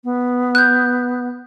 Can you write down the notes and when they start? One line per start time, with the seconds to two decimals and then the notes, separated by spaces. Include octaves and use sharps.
0.04 B3
0.55 F#6 G6